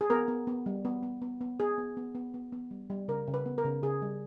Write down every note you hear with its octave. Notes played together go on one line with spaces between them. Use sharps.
G#4
B3 A#4
B3
B3
G3
B3
B3
B3
B3
B3 G#4
B3
B3
B3
B3
B3
G3
G3
C#3 A#4
C#3
B4
B3
A#4
C#3
C#3 G#4
G3